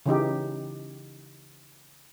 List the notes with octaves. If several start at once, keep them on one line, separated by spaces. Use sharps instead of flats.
C#3 E3 D#4 G4